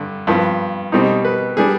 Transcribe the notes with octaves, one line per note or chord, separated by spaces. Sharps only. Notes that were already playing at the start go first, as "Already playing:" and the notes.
Already playing: G2 D3
G2 F3 B3
B2 G3 C4 D#4
B4
G3 B3 D4 G#4